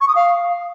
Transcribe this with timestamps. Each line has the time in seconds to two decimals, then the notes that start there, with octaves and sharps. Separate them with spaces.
0.01 C#6
0.08 D#6
0.15 F5